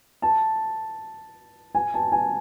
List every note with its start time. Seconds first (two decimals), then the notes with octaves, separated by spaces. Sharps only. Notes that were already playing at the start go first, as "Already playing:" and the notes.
0.22 A5
1.75 G#5
1.94 A5
2.12 G#5